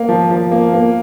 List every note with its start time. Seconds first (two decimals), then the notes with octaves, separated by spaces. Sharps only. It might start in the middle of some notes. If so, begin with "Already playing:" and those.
Already playing: A#3
0.09 F3
0.30 F3
0.52 A#3
0.74 A#3